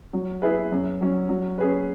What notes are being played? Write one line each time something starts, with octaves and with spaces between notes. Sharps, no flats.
F#3
E4 G#4 B4
F#2
F#3 C#4
F#3
C#4 G#4 B4